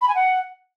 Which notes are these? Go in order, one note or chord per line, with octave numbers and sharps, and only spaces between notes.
B5
G#5
F#5